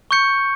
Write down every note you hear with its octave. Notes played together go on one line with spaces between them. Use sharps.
C#6 G6 C#7